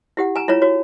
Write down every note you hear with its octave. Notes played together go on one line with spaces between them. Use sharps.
E4 G4 F#5
G#5 A#5
E4 F4 C#5 A#5
F#4 C#5